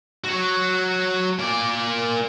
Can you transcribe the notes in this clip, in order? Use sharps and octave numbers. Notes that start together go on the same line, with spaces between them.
F#4 C#5
A#3 D5